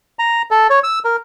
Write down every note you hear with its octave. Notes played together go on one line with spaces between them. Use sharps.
A#5
A4
C#5
E6
A#4